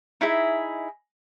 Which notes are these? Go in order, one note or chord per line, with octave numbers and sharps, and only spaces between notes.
D#4 E4 G#4 E5